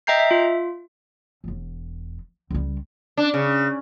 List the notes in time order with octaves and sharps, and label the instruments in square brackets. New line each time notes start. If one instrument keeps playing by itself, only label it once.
[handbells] D#5 E5 G5 A#5 G6 C7
E5
F4
[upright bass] E1 E2
C#2 G3
[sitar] D4
C#3